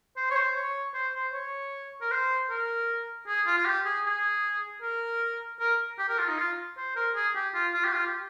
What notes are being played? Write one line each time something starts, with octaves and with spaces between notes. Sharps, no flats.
C5
C#5
C5
C#5
C5
C5
C#5
A#4
C5
A#4
G#4
F4
F4
G4
G#4
G#4
A#4
A#4
G4
A#4
F4
D#4
F4
C5
A#4
G#4
G4
F4
F4
G4
F4
G4